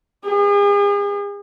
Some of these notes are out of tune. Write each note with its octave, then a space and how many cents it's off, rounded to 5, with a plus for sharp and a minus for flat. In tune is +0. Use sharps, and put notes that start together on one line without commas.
G#4 -40